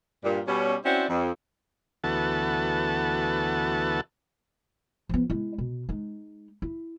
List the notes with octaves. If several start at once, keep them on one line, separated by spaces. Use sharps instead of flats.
G2 A#2
B2 G3 C#4
C4 C#4 E4 F#4 C5 D5
F2
D2 E3 B3 F#4 A4 A5
F3 B3
G#3 E4
B2
G#3 D#4
E4